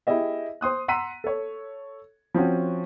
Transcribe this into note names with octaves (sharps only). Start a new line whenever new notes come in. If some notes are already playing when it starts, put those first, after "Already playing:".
E4 G4 G#4 D#5 E5
C5 C6 D#6 F#6
F#5 A#5 C6 E6 B6 D#7
A4 C#5
F3 C4 C#4 F#4